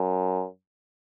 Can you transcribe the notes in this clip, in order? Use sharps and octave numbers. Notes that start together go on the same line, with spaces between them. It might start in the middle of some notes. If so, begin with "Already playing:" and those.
Already playing: F#2